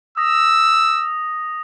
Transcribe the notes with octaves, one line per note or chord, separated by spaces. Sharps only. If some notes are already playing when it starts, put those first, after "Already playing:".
D#6 E6 A#6